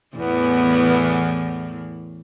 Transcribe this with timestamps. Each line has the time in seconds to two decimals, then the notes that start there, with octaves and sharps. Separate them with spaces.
0.16 E2 A2 E3 B3